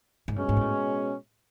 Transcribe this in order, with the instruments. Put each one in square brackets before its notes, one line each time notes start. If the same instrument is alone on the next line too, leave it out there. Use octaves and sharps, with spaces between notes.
[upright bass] G#2
[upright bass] G2 [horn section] B2 G#3 C#4
[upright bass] G#2
A#2
A2